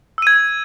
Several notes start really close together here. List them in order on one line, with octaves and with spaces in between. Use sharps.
E6 D#7 G#6